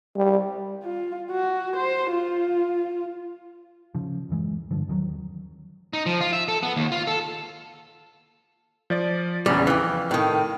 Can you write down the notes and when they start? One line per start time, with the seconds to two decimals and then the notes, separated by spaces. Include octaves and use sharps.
0.16 G3
0.84 F4
1.31 F#4
1.76 C5
2.11 F4
3.95 C#3 F3
4.29 D1 F#2 E3 G#3
4.71 G2 D3 F3
4.88 D#2 D#3 E3 F#3
5.93 D#4
6.06 F3
6.21 F4
6.33 E5
6.48 A4
6.63 B3
6.76 D#2
6.92 F4
7.07 A4
8.90 F3 D5 A6
9.46 A#1 E2 C#3 G3
9.67 F2 E3 F5
10.11 A2 D#3